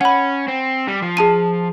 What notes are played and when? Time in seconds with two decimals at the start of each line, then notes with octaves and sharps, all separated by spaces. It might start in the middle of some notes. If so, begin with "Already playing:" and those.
0.01 C#4 F#5 B5
0.48 C4
0.88 G3
1.02 F3
1.17 G#4 A5 D#7